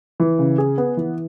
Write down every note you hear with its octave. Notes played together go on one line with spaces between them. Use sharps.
E3
C#3
G#4
B3
E3